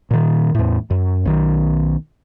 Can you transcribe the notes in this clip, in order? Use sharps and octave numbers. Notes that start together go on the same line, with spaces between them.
A#2 D#3
E2 A2
F#2
B1 D#3